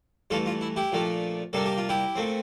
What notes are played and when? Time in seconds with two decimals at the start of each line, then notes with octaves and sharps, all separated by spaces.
0.30 G2 E3 A3 F4 A4
0.46 F4
0.61 E4
0.76 E4 G4
0.92 A#2 F3 A3 D4
1.53 C3 G3 A#3 D4 A4
1.66 G4
1.78 F4
1.89 E4 G4
2.16 A#2 A3 C4